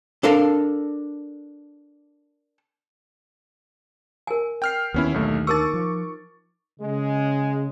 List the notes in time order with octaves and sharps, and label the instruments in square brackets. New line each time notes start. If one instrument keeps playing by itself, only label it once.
[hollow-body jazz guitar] D4 A4 A#4 F5
[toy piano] A#4 G#5
[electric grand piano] G5 F6 C7
[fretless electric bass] D#2 D3 [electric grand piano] B3 C#4 E4
[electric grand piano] B1 A3
[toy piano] D#4 A#4 E6 [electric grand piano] C#6 D6 A6
[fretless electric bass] F3
[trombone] C#3 [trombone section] G#3